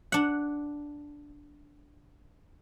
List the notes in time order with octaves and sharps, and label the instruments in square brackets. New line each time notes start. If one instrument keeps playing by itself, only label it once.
[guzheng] D4 F#5